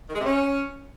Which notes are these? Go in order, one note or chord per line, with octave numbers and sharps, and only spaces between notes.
D#3
G#3
C3
C#4